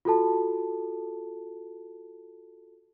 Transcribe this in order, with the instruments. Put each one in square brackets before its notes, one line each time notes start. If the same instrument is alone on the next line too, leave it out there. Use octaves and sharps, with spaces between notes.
[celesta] F4 F#4 A4 A5